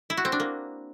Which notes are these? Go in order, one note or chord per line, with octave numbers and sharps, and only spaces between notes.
E4
F#4
C4
D4
A#3